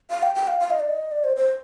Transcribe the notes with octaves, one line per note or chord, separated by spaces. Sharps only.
F5
G5
G5
F5
F5
D#5
D5
D#5
D5
C5
C5